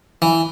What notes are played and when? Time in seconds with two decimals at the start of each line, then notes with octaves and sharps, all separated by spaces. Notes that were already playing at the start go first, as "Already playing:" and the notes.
0.22 E3